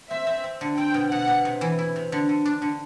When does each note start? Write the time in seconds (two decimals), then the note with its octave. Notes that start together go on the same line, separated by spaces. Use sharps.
0.10 C4 E5
0.27 C4
0.44 C4
0.61 D3
0.77 C4 G5
0.94 B2
1.12 B2 F#5
1.27 B2
1.45 C3
1.61 E3
1.79 E4
1.96 C3
2.12 D3
2.29 D3
2.46 D4
2.62 D3